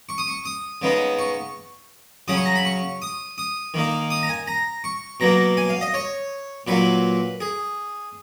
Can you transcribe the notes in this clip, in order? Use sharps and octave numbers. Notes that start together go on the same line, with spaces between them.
C#6
D#6
C#6
D#6
C#3 G#3 B3 D#4
C#6
C#3 F#3 C#4 D#6
C#6
A#5
B5
C#6
D#6
D#6
D#3 A#3 D#4
D#6
A#5
G#5
A#5
C#6
B2 F#3 A#3 A#5
G#5
F5
D#5
C#5
A#2 F#3 A#3 B4
G#4